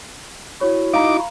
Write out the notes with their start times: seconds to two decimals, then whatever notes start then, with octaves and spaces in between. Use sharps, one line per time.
0.61 E4 F#4 C#5
0.94 D#4 F5 A#5 D6